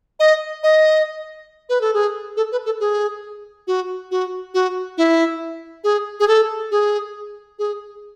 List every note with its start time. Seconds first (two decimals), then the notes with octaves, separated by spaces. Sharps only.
0.20 D#5
0.63 D#5
1.69 B4
1.81 A4
1.94 G#4
2.37 A4
2.52 B4
2.66 A4
2.80 G#4
3.67 F#4
4.11 F#4
4.54 F#4
4.98 E4
5.84 G#4
6.20 G#4
6.28 A4
6.71 G#4
7.59 G#4